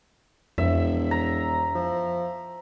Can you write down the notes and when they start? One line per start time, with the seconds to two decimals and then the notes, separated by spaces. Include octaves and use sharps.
0.58 E1 F2 E5
1.11 A#5
1.75 F3